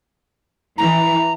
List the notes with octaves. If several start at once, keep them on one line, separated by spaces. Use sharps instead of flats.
E3 A#5